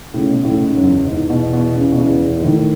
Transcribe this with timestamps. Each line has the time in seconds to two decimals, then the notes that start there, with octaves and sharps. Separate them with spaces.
0.14 A2 C#3
0.29 B2
0.45 A2
0.61 G#2
0.77 F#2
0.84 E2
1.06 E2 G#2
1.30 B2
1.53 B2
1.76 C#3
1.92 B2
1.99 E2 C#3
2.22 B2
2.39 G#2
2.45 A2 D#3